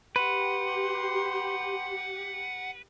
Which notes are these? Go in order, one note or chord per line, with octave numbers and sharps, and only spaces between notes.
G4 B4 F#5 C6